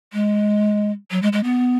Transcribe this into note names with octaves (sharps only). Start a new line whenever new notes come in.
G#3
F#3
G#3
G#3
B3